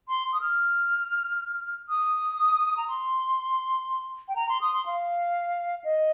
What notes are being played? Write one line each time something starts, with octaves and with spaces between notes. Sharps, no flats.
C6
D#6
F6
D#6
A#5
C6
G5
A#5
C6
D#6
C6
F5
D#5